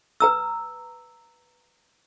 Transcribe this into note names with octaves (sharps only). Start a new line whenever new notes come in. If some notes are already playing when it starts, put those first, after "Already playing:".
B4 A#5 E6